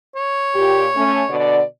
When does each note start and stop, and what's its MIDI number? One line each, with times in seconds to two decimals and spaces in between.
0.16 1.39 73
0.55 0.87 46
0.55 0.87 67
0.95 1.22 57
0.95 1.22 61
1.28 1.61 47
1.28 1.61 50
1.28 1.61 74